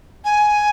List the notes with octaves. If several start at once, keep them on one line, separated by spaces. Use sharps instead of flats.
G#5